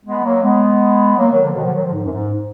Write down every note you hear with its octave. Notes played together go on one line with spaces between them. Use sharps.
G#3 B3
F#3 A#3
G#3 B3
F#3 A#3
D#3 F#3
D3 F3
B2 D#3
D3 F3
D#3 F#3
D3 F3
G#2
F#2
G#2